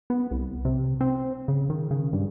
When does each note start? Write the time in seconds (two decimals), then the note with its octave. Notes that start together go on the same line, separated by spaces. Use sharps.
0.10 B3
0.31 C2
0.65 C3
1.01 C4
1.48 C#3
1.70 D#3
1.91 C#3
2.13 G2